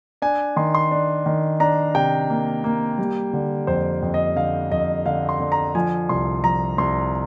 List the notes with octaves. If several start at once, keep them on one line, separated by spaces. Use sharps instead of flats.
D4 G#5
D#3 C6
C6
D4
D#3
D4 A#5
C3 G5
A#3
A#3
G3
D3
F2 C5
F2
D#5
D3 F5
F2 D#5
D3 F5
C6
D3
A#5
F3 G#5
C2 C6
F3 A#5
C2 C6